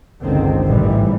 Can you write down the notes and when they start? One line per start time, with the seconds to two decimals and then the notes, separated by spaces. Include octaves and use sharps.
0.22 G1 C#2 D3 D#3 C4
0.67 A1 G#2 E3 G3